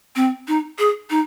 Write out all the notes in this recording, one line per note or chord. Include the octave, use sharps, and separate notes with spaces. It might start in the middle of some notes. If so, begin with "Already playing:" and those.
C4
D#4
G#4
D#4